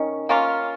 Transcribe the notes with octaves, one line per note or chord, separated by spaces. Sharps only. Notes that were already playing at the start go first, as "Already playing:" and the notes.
Already playing: D#3 C#4
A#3 C#4 F4